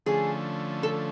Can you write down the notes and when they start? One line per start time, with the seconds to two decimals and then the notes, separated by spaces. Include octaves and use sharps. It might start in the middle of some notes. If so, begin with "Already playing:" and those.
0.06 D3 F3 A3 C#4 G#4
0.83 A4